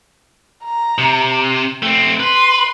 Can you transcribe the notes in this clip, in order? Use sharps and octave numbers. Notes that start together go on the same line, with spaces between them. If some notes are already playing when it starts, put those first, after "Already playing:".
A#5
C3
A3 C4 G5
B4 C6